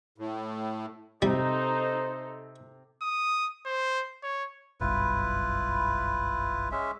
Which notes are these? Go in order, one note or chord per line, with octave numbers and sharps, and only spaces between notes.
A2
C3 G3 D#4 A4 C5
D#6
C5
C#5
F#1 B1 G2 E4 F4 B4
G#3 C#4 E5